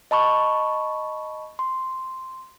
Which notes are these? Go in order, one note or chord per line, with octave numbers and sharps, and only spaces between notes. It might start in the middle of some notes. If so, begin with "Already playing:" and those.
D#5 A5 B5 C#6
C6